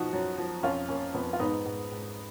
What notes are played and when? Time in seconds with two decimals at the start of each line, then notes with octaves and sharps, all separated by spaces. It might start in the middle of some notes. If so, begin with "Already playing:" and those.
Already playing: B2 F3 D#4 F#4
0.13 F#2
0.38 F3
0.63 F2 C#4 F4
0.89 A#3 C#4
1.14 F2 B3
1.33 F4
1.39 G#2 B3 D#4
1.65 G#2
1.91 G#2